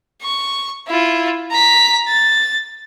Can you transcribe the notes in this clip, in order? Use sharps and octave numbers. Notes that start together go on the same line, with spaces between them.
C#6
E4 F4
A#5 B6
A6